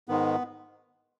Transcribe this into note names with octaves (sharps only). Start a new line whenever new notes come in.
G#2 D#3 G#3 B3